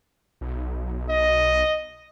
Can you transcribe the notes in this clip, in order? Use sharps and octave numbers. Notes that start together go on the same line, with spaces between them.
B1
D#5